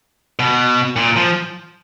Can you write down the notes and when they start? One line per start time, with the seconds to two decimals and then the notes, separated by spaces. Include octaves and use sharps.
0.39 B2
0.96 A#2
1.16 F3